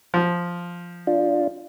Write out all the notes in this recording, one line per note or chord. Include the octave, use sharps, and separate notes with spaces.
F3
D4 F4